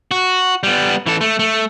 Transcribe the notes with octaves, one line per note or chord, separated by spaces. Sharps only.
F#4
G3 B3
E3 A4
A3
A3